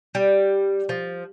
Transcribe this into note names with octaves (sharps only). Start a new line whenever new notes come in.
G3
F3